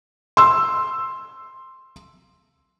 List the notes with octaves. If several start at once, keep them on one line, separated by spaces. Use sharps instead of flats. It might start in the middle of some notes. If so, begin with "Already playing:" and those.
C6 E6